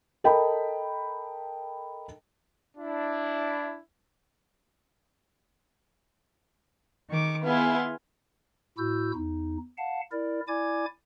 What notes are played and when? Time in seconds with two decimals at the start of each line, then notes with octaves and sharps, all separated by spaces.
0.24 A4 A#4 D#5 G5 A5 B5
2.77 D4 E4
7.09 D#3 C#6 D6
7.44 B3 E4 G#4 F5 G#5 C6
8.78 A2 E4 F#4 E6 G6
9.15 E2 D#4
9.78 F5 F#5 A5
10.12 E4 A#4 D5
10.48 E4 D5 G#5 D6 G#6